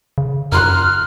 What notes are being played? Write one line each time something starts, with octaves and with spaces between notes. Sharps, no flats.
C#3
F#2 A#5 C6 F6 F#6